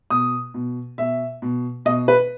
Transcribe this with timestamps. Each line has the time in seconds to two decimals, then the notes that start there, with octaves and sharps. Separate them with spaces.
0.10 B2 D#6
0.54 B2
0.98 B2 E5
1.42 B2
1.85 B2 D#5
2.08 B4